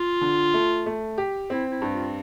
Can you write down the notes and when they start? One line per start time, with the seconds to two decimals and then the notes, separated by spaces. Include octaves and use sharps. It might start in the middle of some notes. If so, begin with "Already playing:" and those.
Already playing: F4
0.21 D3
0.54 A3
0.86 A3
1.18 G4
1.50 C4 E4
1.71 E4
1.82 G2
1.93 F4